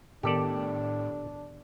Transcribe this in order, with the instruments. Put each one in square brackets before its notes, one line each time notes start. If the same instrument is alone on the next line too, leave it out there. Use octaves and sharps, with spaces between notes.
[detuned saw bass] A2 [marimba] D#3 B3 A#4 [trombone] D4 [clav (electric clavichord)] G4 A4 D5